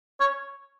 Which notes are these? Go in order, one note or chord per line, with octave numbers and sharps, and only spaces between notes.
C#5